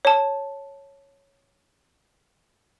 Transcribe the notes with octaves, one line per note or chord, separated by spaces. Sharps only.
C#5 A5